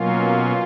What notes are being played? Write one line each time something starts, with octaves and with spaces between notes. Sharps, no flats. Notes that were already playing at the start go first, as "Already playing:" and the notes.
Already playing: B2 F#3 A#3 C#4 F4